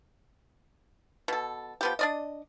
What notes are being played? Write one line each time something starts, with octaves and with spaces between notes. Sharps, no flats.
B2 A4
F3 B3 G4
D4 D5 D#5